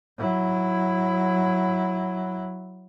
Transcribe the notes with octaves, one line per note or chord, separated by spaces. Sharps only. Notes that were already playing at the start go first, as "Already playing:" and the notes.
F#3 E4